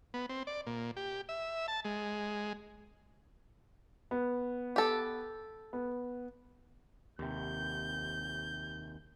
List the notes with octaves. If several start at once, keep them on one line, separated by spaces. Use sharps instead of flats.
B3
C4
D5
A#2
G4
E5
A5
G#3
B3
G4 A4
B3
D#2 C3 G6